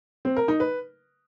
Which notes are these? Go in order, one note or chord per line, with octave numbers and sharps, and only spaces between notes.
C4
A#4
D#4
B4